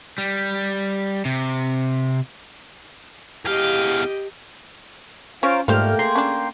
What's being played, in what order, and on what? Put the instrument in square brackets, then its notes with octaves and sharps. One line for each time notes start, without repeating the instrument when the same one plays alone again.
[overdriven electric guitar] G3
C3
[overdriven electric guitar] E2 F5 [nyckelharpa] G4 D#5
[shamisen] C#4 [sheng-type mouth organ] F4 C5 F5 [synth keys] C#5 A#5 D7
[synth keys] G#2 G3 F6 [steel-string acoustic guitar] A3 [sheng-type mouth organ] A#3 G5 [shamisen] F4 C5
[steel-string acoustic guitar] G#4 [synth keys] A#5 C6 C7
[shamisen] C#4 D4